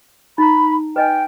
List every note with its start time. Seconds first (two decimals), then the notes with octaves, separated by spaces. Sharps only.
0.38 D#4 A#5 B5
0.96 B4 D#5 G5 G#5